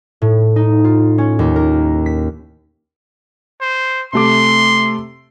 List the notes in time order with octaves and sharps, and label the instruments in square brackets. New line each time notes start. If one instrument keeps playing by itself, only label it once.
[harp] A2
D#4
F4
C#4
D#2
A#4
B6
[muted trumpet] C5
[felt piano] C3 A3 D6 [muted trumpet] C6